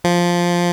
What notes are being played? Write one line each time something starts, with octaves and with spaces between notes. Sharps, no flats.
F3